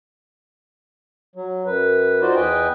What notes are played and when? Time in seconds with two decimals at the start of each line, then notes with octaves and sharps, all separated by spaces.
1.35 F#3
1.66 F#2 B4
2.22 D#4 F4 F#4 C5 D5
2.36 E2 B4 D#5 G5 G#5